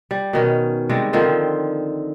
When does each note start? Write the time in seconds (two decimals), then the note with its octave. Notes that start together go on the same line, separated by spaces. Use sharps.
0.11 G3
0.33 B2 D#3 C#4
0.89 C3 G3 G#3
1.13 D3 D#3 F3 C4